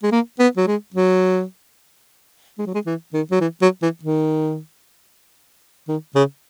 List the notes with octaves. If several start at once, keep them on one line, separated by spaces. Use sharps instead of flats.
G#3
A#3
B3
F#3
G#3
F#3
G#3
F#3
G#3
E3
D#3
F#3
E3
F#3
E3
D#3
D#3
C#3